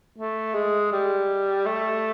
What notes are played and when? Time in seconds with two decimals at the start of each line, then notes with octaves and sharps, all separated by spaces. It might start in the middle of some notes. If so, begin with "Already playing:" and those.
0.18 A3
0.55 G#3
0.92 G3
1.66 A3